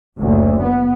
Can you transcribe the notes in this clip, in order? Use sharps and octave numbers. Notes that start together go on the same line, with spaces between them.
F#1 D2
B3